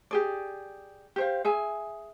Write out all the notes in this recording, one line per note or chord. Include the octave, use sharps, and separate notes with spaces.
G4 G#4 D5
G4 C5 F5
G#4 E5 G#5